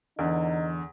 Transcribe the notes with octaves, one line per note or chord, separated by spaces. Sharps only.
E2 D3 E3 D#4